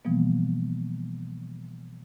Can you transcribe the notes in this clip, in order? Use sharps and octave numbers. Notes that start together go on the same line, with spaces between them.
B2 E3 F3 G3 A#3 B3